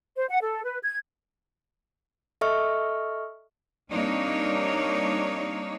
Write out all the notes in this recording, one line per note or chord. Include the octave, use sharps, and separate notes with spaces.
C5
F#5
A4
B4
G#6
A4 D#5 E5 C#6 F6
G3 A#3 C4 D4 D#4 C#5